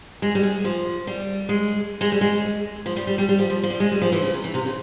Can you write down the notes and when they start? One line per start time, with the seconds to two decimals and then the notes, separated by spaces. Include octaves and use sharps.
0.22 G#3
0.35 G3
0.43 G#3
0.64 F3
1.07 G3
1.49 G#3
2.01 G#3
2.12 G3
2.21 G#3
2.86 F3
2.96 G3
3.07 G3
3.18 G3
3.29 G3
3.39 F3
3.50 F3
3.63 F3
3.70 G3
3.80 G#3
3.92 G3
4.02 F3
4.12 E3
4.22 C#3
4.34 C3
4.44 E3
4.54 C3
4.65 C#3